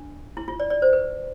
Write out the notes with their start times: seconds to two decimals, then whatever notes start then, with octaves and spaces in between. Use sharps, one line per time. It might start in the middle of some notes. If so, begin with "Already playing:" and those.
Already playing: D4
0.37 E4
0.48 F4
0.60 D5
0.70 D5
0.82 C5
0.93 B4